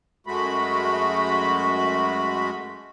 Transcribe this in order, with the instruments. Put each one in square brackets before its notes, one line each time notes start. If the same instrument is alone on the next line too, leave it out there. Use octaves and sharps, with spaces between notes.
[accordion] F#2 G#3 A3 F#4 B5